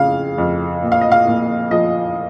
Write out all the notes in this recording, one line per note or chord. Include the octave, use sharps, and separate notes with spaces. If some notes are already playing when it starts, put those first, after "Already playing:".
Already playing: F2 C#3 F5
F2
A#2
F5
D#5
F5
A#2
F3 D#5